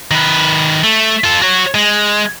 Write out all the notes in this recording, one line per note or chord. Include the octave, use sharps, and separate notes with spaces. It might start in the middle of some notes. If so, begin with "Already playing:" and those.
D#3 B4
A3
F4 A4
F#4 C#5
G#3